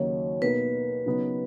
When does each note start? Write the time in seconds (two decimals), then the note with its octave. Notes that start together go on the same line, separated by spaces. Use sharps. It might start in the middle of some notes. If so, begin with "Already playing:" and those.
Already playing: D#2 C#3 F#3 A#3 D#4 C#5
0.42 B2 A#3 D#4 A#4 B4
1.06 C#3 F#3 B3 D#4